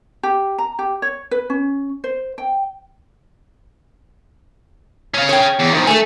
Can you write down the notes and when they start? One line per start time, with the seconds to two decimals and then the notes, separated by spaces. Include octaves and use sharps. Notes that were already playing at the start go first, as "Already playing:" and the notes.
0.23 G4
0.58 A#5
0.79 G4
1.02 C#5
1.31 B4
1.50 C#4
2.04 C5
2.38 G5
5.14 C#4 F5
5.29 C#5 G5
5.60 E2
5.74 D#3 F3
5.87 A3 A4 G#5